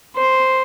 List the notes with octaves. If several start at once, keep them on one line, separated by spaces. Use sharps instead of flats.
C5